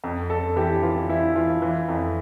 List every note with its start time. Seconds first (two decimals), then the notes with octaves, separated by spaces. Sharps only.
0.04 F2
0.30 F2 A4
0.56 E3 G4
0.83 E3 F4
1.09 E3 E4
1.36 E3 F4
1.62 E3
1.88 F2